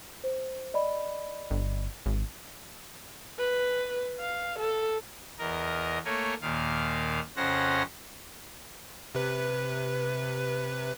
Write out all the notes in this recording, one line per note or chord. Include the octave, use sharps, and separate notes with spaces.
C5
D5 D#5 B5
G1
G#1
B4
F5
A4
E2 A#4 D#5
A3 A#3 A#4 C#5 G#5
D#2 A#2 D#3 F5
F2 C#3 C#4 C5 F#5 A#6
C3 B4